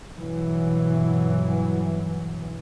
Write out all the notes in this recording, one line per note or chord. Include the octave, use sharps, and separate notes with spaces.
G2 B2 E3 F#3